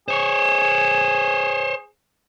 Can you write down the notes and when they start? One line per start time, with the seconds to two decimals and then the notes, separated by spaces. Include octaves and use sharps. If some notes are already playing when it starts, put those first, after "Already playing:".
0.08 G#4 C5 C#5